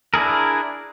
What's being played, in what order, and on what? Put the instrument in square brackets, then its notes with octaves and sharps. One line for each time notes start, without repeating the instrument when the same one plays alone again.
[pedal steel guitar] D4 E4 G#4 A#4